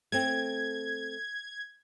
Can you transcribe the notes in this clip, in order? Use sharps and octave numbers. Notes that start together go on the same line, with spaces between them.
A3 C4 G#6